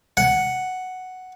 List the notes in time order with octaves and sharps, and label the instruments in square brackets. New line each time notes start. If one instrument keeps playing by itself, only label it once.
[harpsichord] F#5